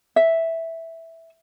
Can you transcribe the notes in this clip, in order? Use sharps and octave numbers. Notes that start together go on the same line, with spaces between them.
E5